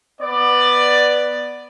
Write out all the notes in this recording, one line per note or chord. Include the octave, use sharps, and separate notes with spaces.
B3 D5